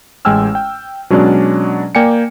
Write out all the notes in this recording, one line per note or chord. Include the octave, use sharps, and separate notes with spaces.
A1 G#3 G5 G#5 E6 F6
G5
B2 F#3 G#3 C#4 D4 D5
A#3 D5 G5 G#5 C#7